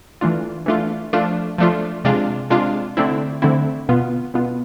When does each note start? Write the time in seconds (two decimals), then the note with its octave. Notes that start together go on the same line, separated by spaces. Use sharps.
0.21 E3 A3 D4 F4
0.66 E3 A3 D4 F4
1.13 F3 A3 D4 F4
1.58 F3 A3 D4 F4
2.04 C3 G#3 D4 F4
2.50 C3 G#3 D4 F4
2.97 D3 A3 C4 E4
3.42 D3 A3 C4 E4
3.89 B2 B3 F4
4.34 B2 B3 F4